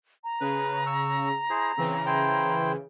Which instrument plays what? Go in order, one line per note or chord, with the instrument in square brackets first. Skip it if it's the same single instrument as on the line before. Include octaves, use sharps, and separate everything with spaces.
[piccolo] A#5
[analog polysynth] C#3 [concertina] B4
[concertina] C#6 E6
E4 G#4 C5
[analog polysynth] C#3 E3 [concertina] C4
[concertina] E4 C5 G5